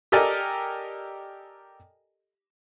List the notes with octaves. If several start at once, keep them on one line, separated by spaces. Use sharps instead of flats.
G4 A4 A#4 D5 D#5 G#5